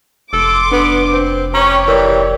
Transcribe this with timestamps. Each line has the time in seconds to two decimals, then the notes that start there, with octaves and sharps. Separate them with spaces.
0.33 F1 A4 C6 D6
0.71 B3 D4 B4
1.12 C4
1.54 C#4 G4 C#5 A#5 C#6
1.88 E3 A#4 D5